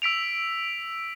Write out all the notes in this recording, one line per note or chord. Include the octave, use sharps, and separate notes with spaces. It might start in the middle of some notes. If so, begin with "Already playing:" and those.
E6 B6 D7 F7